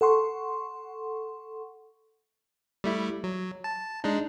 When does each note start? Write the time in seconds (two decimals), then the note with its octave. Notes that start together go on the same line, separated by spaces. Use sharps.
0.01 A4 F#5 C6 C#6
2.84 G3 A3 E4
3.24 F#3
3.64 A5
4.04 G#3 D4 D#4